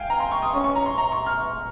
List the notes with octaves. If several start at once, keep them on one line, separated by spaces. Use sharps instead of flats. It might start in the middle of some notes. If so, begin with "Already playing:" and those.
Already playing: F5 G5 G#5
A#5
C6
C#6
D#6
C#4 C#6
C#6
A#5
C6
A#5
C#6
F6